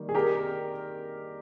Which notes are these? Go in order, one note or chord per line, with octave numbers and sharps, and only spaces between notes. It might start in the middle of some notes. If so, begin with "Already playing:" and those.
Already playing: D#3 G3 A#3
G#4
G4 A#4